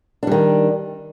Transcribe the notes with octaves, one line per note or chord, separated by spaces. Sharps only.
D#3 G3 D4